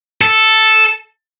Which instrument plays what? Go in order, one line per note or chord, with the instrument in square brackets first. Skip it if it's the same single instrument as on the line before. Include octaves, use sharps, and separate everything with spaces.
[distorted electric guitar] A4